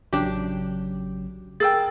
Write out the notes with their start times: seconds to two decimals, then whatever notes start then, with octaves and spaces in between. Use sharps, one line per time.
0.13 A1 C#3 F#3 D4 G4
1.60 G#4 A#4 G5 E6 A6